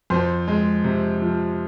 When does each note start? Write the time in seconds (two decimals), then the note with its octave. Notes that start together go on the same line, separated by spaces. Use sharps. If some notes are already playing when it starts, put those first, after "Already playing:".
0.10 F2 C5
0.48 G#3
0.84 C3
1.22 F3